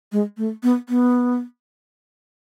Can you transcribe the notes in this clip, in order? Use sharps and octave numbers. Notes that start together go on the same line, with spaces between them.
G#3
A3
B3
B3